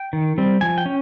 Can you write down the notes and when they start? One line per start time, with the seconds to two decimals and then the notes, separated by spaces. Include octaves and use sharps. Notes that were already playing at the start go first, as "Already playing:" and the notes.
Already playing: G5
0.13 D#3
0.38 G3 C4
0.61 F3 G#5
0.78 G5
0.86 C#4